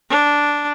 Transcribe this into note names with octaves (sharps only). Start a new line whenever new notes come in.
D4